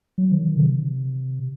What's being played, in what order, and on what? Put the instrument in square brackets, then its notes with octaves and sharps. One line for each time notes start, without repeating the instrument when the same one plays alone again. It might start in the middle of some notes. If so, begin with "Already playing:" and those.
[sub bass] F#3
D#3
D#3
C#3
C3